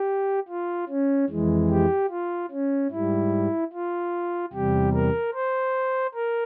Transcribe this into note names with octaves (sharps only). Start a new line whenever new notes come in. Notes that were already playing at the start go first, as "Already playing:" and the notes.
Already playing: G4
F4
C#4
F2 E3 G#3
G4
F4
C#4
G#2 G3 E4
F4
E2 C3 G3 G4
A#4
C5
A#4